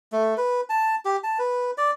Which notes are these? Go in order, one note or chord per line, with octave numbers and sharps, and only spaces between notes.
A3
B4
A5
G4
A5
B4
D5